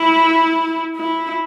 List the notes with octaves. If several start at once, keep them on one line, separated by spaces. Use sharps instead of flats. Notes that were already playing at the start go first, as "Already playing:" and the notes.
Already playing: E4
E4